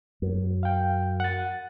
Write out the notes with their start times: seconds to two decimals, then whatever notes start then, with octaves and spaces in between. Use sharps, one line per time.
0.22 F#2
0.63 F5 G5
1.20 F#5 A6